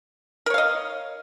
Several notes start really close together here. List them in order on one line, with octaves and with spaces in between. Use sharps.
A#4 C#5 F5 D#5